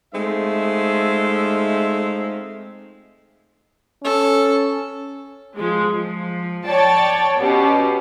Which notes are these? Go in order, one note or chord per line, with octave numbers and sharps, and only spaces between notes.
G#3 A3 C4 D#4 F4 E5
C#4 A4
F3 G#3
F3
C#5 D5 G5 A5
B2 C#4 G4